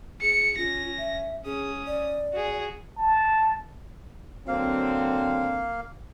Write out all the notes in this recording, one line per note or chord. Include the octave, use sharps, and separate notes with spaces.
G#4 C#7
C#4 F4 A#6
E5
C#4 G#4 D#6
D5
F#4 G#4
A5
D3 F#3 A#3 C4 F5